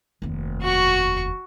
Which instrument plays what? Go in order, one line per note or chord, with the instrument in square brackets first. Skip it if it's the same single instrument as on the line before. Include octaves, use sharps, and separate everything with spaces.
[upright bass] F1 D#2
[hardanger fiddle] F#4 C#6